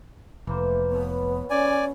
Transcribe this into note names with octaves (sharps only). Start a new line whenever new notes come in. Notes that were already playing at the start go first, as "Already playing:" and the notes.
F1 E3 A3 A#3 C5
B2 B3 C#5
C#4 D5 G#5